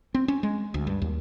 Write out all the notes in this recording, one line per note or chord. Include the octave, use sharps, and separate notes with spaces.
C4
C#4
G#3
D2
G2
D#2